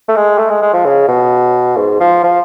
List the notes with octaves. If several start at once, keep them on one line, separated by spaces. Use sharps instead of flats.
A3
G#3
A3
G#3
G#3
F3
C#3
B2
G#2
F3
F3